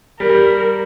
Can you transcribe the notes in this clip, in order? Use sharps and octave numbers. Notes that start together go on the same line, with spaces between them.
G3 A#4
G3